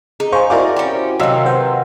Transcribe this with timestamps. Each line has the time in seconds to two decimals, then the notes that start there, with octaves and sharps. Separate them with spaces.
0.20 D#4 G#4
0.32 C5 F5 G#5 C#6
0.50 E4 F#4 A#4 C5 D5 D6
0.76 C#4 G4
1.20 C3 D#3 F#3 D#5 F5 F#5 E6
1.46 B4 C5 F#5